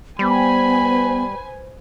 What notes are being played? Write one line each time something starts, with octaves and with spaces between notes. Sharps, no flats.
G3 B3 B4 C5 G#5 B5